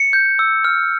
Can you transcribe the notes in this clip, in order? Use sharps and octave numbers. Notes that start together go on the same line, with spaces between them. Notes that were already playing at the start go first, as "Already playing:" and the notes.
Already playing: C#7
G6
E6
F6